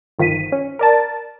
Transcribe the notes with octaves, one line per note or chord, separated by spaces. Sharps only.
G1 D#3 F3 B6 D#7
C#4
A#4 D5 A5